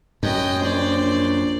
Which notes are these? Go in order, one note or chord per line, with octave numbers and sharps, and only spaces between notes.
F#2 D#5 G5
A#1 C5 D5